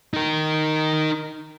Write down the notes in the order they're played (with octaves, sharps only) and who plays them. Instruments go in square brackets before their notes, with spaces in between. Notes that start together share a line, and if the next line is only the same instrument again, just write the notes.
[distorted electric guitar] D#4 A#4